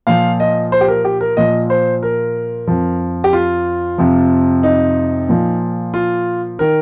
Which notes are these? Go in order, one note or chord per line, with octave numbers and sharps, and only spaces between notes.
A#2 F3 F5
D#5
C5
G4
A#4
G4
A#4
A#2 F3 D#5
C5
A#4
F2 F3
G4
F4
F2 C3 F3
D#4
A#2 F3
F4
D#3 A#4